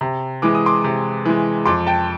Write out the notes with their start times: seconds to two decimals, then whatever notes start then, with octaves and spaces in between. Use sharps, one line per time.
0.01 C3
0.42 E3 G#3 D6
0.55 D#6
0.66 C6 D6
0.84 C3
1.26 E3 G#3
1.66 F2 C6 D6
1.87 G5 A5